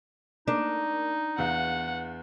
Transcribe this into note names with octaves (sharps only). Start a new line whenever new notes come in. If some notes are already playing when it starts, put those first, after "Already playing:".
A#3 D4 D#4
E2 F5 F#5